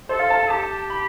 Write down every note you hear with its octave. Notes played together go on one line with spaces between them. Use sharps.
A4 C5
F5
A5
G4 A5
B5